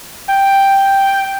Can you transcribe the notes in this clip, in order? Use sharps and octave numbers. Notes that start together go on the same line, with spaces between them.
G5